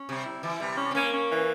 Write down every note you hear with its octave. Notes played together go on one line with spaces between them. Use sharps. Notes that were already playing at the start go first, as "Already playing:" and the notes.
Already playing: C#4
C3 G3
E4
E3 E4
C3 G3
C#4
C4
A#3 C#4
C#4
E3